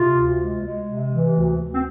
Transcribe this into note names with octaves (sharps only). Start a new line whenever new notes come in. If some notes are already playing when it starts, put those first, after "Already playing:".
Already playing: C3 F4
D2
G#3
G#3
C3
E3
D2
D2
C4